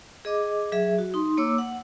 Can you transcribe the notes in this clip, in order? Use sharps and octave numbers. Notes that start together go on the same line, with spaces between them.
G#4 D#5 D6
F#3 G#4 E5
F#4
D#4 C6
A#3 C#5 D6 E6
F#5